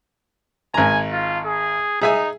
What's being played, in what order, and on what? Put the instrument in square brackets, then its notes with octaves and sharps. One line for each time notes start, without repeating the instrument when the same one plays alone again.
[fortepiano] G#1 A#5 [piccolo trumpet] G#5
[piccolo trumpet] F4
G#4
[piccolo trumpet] D#4 [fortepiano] G#4 E5 G#5